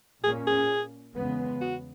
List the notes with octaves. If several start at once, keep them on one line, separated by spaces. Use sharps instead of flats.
A#2 A#3 C#4 G#4
G#4
E2 C#3 G#3 B3
F#4